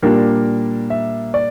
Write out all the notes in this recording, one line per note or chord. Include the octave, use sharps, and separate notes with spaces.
A#2 G3 A#3 D4 A#4
E5
D5